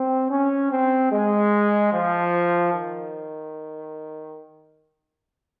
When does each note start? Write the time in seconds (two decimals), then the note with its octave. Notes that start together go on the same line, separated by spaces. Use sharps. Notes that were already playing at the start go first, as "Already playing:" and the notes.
Already playing: C4
0.31 C#4
0.72 C4
1.13 G#3
1.93 F3
2.74 D#3